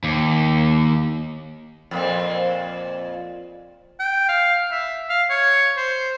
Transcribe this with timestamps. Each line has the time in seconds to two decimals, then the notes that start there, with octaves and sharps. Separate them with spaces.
0.04 D#2
1.91 F2 A#2 C4
4.00 G5
4.29 F5
4.72 E5
5.09 F5
5.30 C#5
5.77 C5